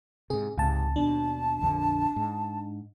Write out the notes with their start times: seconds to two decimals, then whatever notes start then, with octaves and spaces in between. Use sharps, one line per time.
0.30 G#2 C3 G#4
0.58 C#2 G#2 C3 A5
0.96 D#2 B2 D4 A5
1.61 A#1 F2 D3
2.16 G#2